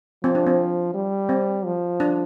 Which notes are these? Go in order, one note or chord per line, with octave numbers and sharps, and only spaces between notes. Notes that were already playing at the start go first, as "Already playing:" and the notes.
F3 C4
D4
C4
G3
C4
F3
D4